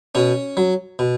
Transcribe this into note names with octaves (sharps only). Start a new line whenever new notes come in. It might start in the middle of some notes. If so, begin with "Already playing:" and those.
B2 C#4
F#3
B2